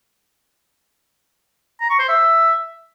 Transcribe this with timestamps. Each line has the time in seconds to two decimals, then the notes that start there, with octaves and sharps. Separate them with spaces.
1.81 A#5
1.90 C#6
1.99 C5
2.09 E5